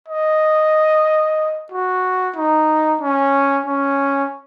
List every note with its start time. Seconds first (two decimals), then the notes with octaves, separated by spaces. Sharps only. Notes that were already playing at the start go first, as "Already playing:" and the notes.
0.08 D#5
1.72 F#4
2.36 D#4
3.01 C#4
3.66 C#4